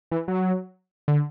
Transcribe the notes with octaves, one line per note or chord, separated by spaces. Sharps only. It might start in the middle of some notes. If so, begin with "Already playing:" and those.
E3
F#3
D3